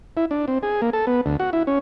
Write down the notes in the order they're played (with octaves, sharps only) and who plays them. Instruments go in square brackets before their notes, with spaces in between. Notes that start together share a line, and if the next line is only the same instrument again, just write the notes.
[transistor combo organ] E4
D4
C4
G#4
A#3
A4
B3
D2
F#4
E4
C#4